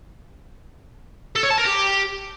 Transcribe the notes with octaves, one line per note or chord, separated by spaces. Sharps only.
A4
C#5
A5
A#4
G4